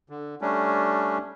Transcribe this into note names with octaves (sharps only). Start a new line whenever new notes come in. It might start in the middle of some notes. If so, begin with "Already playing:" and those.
D3
G3 A3 C#4 D4